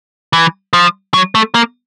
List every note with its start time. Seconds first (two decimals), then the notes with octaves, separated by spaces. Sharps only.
0.33 E3
0.73 F3
1.14 F#3
1.35 A3
1.55 A#3